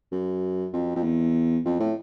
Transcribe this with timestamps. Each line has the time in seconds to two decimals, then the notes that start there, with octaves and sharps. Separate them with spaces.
0.12 F#2
0.73 F2
0.96 F2
1.03 E2
1.65 F2
1.80 A2